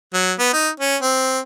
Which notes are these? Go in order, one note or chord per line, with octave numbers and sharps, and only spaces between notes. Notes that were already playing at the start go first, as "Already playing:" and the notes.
F#3
B3
D#4
C#4
C4